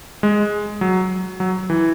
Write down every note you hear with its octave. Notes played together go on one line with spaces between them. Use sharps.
G#3
F#3
F#3
E3